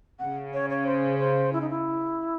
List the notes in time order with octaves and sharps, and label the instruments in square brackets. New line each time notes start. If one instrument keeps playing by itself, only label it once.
[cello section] C#3 [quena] F#5
[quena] C#5
C#5
C5
C5
E4
D#4
E4